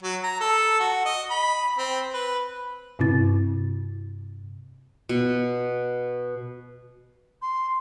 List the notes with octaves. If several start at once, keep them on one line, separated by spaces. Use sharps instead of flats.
F#3
A#5
A4
F#4
D#5
B5
C4
B4
G2 C3 C4 E4 A6
B2
C6